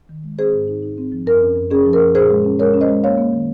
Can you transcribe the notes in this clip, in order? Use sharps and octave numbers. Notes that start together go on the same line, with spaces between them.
D#3
G#3
C4 G#4 C5
G#2
D#4
D#4
C4
F3
F#2 A#4
C#4
F#2
C#4 G#4
F3
A#4
F#2
A#2 G#4 C5
G#3
C#4
G#3 A#4 C#5
C#4
C5 D#5
G#3
A#3 C#5 F5
A#3
D#3